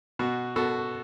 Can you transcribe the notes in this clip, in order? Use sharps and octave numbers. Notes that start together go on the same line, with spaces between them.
B2 F#4
B2 F#4 A4